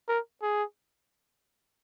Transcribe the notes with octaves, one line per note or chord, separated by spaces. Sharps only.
A#4
G#4